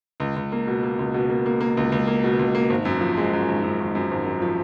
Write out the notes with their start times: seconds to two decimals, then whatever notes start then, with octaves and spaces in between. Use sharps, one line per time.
0.20 C#2
0.36 C#2
0.52 A#3
0.67 B2
0.83 A#3
0.99 C#2
1.14 B2
1.30 A#3
1.46 A#3
1.61 A#3
1.77 C#2
1.92 C#2
2.07 A#3
2.24 B2
2.39 C#2
2.55 A#3
2.70 G#1
2.85 F#2
3.01 F3
3.17 G#3
3.33 F#2
3.48 G#1
3.63 F#2
3.80 G#1
3.95 F#2
4.11 G#1
4.26 F#2
4.42 F3